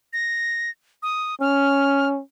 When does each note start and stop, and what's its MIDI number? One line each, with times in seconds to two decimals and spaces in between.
0.13 0.70 94
1.03 1.35 87
1.41 2.21 61
1.41 2.09 89